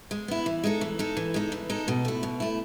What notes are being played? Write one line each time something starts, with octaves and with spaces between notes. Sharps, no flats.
G#3
B3 E4
E3
G#3 D#4 A4
E3
G#3 D#4 A4
E3
G#3 D#4 A4
E3
G#3 D#4 A4
B2
A3 E4
B2
A3 E4